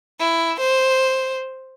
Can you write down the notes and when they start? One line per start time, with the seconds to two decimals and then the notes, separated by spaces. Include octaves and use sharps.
0.20 E4
0.60 C5